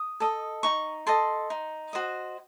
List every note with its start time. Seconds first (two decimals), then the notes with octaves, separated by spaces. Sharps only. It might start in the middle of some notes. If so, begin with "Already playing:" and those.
Already playing: D#6
0.20 A4 D#5
0.63 D#4 C#6
1.07 A4 D#5 C6
1.50 D#4
1.93 F#4 C5 D#5